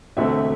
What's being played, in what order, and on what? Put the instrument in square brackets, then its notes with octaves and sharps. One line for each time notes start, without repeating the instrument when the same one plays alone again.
[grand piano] E1 D2 D3 A3 C4 E5